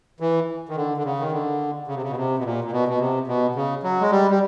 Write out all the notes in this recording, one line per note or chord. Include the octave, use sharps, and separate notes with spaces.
E3
D#3
D3
D3
C#3
D#3
D3
C#3
C3
C#3
B2
C3
B2
A#2
A#2
B2
B2
C3
B2
C#3
F#3
G#3
G3
G3